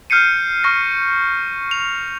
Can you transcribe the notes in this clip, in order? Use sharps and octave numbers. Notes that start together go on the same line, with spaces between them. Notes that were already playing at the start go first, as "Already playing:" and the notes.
F6 G6 C7 C#7 D#7
C#6 F6 A#6
F7